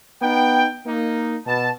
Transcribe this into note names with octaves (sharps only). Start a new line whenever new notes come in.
B3 D#4 G5
A#3 D#4
B2 A5